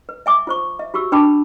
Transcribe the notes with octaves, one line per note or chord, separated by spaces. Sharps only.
B4
E5 G#5 D6
F4 C5 C#6
E5
F#4 G4 C#6 E6
D4 B4 G5 A5 B5 D6